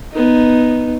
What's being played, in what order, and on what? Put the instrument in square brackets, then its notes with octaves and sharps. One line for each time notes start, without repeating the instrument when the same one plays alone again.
[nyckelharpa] B3 D#4